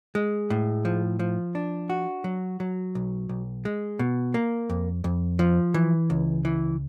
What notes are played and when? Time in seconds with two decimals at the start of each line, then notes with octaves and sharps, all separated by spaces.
0.15 G#3
0.50 A2
0.85 F3
1.19 F3
1.55 D4
1.90 F#4
2.24 F#3
2.60 F#3
2.95 B1
3.29 B1
3.65 G#3
3.99 B2
4.34 A#3
4.69 F2
5.04 F2
5.39 F3
5.74 E3
6.10 C#2
6.45 E3